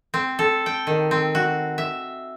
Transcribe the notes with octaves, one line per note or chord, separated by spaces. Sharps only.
C4
A4
G5
D#3
C4
F#4
E5